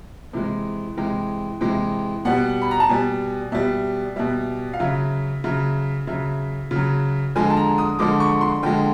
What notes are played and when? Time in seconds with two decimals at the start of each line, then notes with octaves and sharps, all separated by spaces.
0.33 C3 E3 G#3
0.97 C3 E3 G#3 G5
1.61 C3 E3 G#3 G5
2.25 B2 G3 F#5
2.62 B5
2.71 A#5
2.80 A5
2.89 B2 G3 G#5
3.52 B2 G3 E5
4.16 B2 G3 E5
4.73 F5
4.79 C#3 F#3 E5
5.44 C#3 F#3 E5
6.07 C#3 F#3 E5
6.71 C#3
6.76 F#3
7.35 D3 F3 G#3 G#5
7.50 A5
7.57 A#5
7.78 D#6
7.99 D3 F3 G#3 D6
8.20 C#6
8.41 C6
8.63 D3 F3 G#3 G5